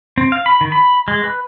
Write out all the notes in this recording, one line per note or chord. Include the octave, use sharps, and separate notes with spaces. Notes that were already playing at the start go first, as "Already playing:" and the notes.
C4
F5
B5
D#3
B5
G#3
B4